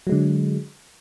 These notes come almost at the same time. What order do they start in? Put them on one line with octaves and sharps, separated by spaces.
F#3 G#3 D3